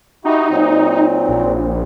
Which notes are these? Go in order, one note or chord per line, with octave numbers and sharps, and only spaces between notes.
D#4 E4 F#4 G4
A#2 F#3 C4
A#1